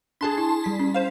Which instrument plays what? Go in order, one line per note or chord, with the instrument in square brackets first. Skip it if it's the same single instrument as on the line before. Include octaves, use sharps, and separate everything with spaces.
[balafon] D4 A4 [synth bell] G#4 A5 C6
[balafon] E4
[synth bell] G3 B6
[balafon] C#4
[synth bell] C5 F5